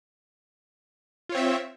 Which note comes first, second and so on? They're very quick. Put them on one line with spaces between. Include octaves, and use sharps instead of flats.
F4 C#5 C4 E5